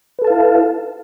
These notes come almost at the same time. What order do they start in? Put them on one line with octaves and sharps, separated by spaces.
B4 A4 A5 F5 E4